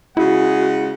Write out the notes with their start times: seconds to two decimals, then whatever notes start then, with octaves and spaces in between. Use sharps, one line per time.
0.17 C#3 G#3 E4 F#4 F#5